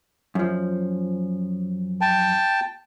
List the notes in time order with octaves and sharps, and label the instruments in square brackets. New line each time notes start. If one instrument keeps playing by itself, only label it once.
[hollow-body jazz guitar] F#2 F3
[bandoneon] G5 A5